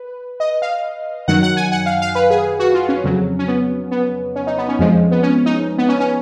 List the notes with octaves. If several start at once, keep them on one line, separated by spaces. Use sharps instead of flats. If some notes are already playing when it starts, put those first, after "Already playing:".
Already playing: B4
D#5
F5
F#2 D#3 F#3 F#5
F#5
G#5
F#5
F5
F5
B4
G#4
F#4
F4
C#4
F2 C#3 F#3
C#4
B3
B3
C#4
D#4
B3
C#4
F2 F3 G#3
B3
C#4
D#4
B3
C#4
C#4